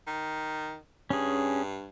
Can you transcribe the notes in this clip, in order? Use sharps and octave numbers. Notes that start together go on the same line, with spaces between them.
D#3
G2 C#4 G#4